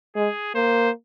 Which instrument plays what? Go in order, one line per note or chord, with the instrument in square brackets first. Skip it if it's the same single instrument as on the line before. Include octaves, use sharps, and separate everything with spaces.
[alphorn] G#3 [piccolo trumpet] G#4
[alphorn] A#3 [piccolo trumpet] C5